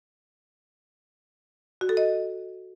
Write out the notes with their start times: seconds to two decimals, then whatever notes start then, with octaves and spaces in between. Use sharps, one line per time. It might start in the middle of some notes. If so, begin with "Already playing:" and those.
1.81 F#4
1.89 A4
1.97 D#5